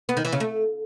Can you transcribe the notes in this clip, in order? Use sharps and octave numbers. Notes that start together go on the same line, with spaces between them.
B3
D#3
E3
C#3
A3